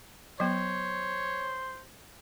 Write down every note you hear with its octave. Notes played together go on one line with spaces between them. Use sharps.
F#3 B3 C5 C#5